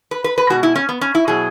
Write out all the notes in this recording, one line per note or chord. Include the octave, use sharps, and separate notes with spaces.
B4
B4
B4
B2 G#3 F#4
E4
C#4
B3
C#4
E4
B2 F#3 G#4